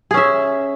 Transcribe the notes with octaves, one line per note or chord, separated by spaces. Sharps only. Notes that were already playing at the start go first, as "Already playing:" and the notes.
C#4 G#4 E5